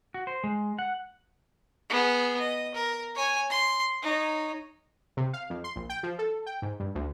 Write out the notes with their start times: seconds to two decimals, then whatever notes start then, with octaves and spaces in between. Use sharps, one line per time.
0.14 F#4
0.27 C5
0.44 G#3
0.79 F#5
1.90 B3 G#4
2.39 D#5
2.75 A#4
3.15 C#5 G#5
3.50 C6
4.02 D#4 C#5
5.17 C3
5.33 F5
5.50 F2
5.64 C6
5.76 A#1
5.90 G5
6.03 F3
6.19 A4
6.46 G5
6.62 G#2
6.80 G2
6.95 D2